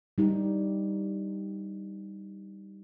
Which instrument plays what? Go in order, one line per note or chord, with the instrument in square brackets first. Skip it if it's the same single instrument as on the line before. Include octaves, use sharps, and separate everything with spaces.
[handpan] G3 D#4 G4